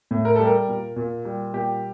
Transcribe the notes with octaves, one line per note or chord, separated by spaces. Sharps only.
A2
A#4
G3 A4
A#4
A#2
A#2
G3
A#2 G4